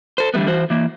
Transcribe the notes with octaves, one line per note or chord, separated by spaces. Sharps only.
A4 C5
D3 E3 G3 A3 B3
E3 F#4 C5
E3 A#3